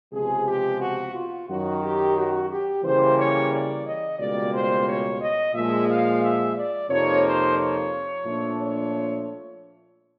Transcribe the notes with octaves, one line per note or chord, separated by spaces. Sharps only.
C#2 C3 F3 G#3 B3 G#4
G4
F#4
F4
F#2 D#3 F#3 F#4
G4
F#4
G4
C#3 E3 G3 A#3 C5
C#5
D5
D#5
C#2 B2 G3 A#3 D5
C5
C#5
D#5
A#2 F3 G#3 E5
F5
E5
D5
F2 C3 F3 A#3 D#4 C#5
C5
C#5
A#2 F3 A3 D4
C#5